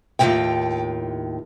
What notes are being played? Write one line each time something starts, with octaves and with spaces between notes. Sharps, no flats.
D#2 A2 D#3 G#3 F4 G5